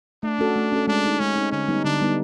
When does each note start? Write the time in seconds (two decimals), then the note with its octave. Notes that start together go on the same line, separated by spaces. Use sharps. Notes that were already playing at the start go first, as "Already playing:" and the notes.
0.23 A3 D4
0.39 C#4 F#4 A4
0.56 A3
0.72 C#4 F#4 A4
0.87 G#3 D4
1.04 C4 D#4
1.20 G#3 C#4
1.36 C4 D#4
1.52 D3 C#4
1.68 G3 B3 D#4
1.84 D3 D4
2.01 G3 B3 D#4